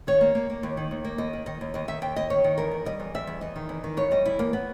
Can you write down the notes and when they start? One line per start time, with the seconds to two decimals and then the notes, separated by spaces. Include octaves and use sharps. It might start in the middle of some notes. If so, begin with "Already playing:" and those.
0.07 D#3 C#5
0.21 A#3
0.35 A#3
0.50 A#3
0.63 D#2
0.77 D#3
0.91 D#2
1.05 A#3
1.18 D#2 D#5
1.33 D#3
1.46 D#3 D#5
1.61 D#2
1.74 D#2 D#5
1.88 D#3 E5
2.02 D#2 G5
2.16 D#2 D#5
2.30 D#3 C#5
2.44 D#3
2.58 E2 A#4
2.71 D#3
2.85 G3 D#5
3.00 E2
3.14 G3 E5
3.27 E2
3.41 E2 D#5
3.56 D#3
3.69 E2
3.84 D#3
3.97 E2 C#5
4.11 G3 D#5
4.26 E2 E4
4.39 E2 A#3
4.53 B3